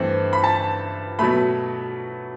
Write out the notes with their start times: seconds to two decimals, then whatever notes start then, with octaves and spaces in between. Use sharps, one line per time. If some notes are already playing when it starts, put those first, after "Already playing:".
Already playing: G2 E3 A3 C4
0.33 B5
0.44 A5
1.19 B2 F#3 A3 B5